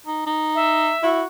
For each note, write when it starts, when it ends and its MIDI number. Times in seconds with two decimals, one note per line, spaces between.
0.06 0.23 63
0.27 0.92 63
0.55 1.09 76
1.03 1.23 64
1.03 1.26 66